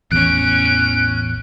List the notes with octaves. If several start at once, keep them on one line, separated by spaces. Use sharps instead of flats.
A1 E2 C#4 F#6 D7